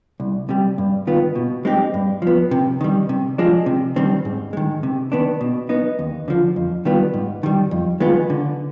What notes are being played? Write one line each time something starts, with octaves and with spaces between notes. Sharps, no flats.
C2
C3 G3
G2
D#3 B3 F4
B2
G#3 C4 D#4 G4
G2
F3 B3
C3
D#3 G3
C3
F3 G#3 D4
C3
D#3 G3 C4
G#2
D#3 G#3
C3
D#3 B3 D4
B2
B3 D#4
D#2
D3 F3
F2
D#3 G3 B3 F4
G#2
D#3 G3
F2
D#3 G#3 B3 F4
D3